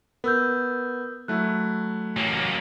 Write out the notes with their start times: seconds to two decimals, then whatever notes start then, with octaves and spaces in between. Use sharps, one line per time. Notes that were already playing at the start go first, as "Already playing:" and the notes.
0.24 B3 A#4 E6 G6
1.28 F#3 A3 E4 F#6
2.17 A1 F#3 A#3